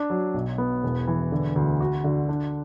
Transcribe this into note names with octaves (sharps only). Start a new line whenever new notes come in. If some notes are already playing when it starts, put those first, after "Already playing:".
Already playing: D4
F#3
B1
B3
E1
E3
D3
D2
F#4
D3
D4